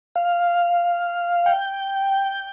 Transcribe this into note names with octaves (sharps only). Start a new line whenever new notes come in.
F5
G5